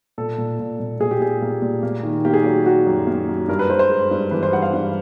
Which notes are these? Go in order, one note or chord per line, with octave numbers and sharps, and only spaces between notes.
A#2 A4
A#2
A#2
A#2
A#2 G#4
G4
A#2 G#4
A#3
A#2
A#3
D#3
A#3 G4
G#4
F#3 G4
F#3 F#4
F#2
A#3
F#3
G2 A#4
B4
G2 C5
C5
G#3
G2
E3 B4
C5
G2 F#5
F5
G2